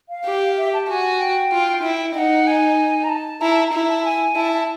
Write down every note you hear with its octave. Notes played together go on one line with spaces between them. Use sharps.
F5
G4
E5
A5
F#4 G#5
G5
F4
E4
D#4 F#5
G#5
A#5
A5
E4 A#5
A5
A#5
E4 A#5
A5
G#5
E4 A5
A5